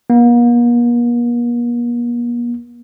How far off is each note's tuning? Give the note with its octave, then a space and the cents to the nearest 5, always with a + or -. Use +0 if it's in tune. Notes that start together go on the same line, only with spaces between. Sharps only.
A#3 +45